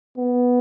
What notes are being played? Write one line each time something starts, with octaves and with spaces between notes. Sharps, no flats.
B3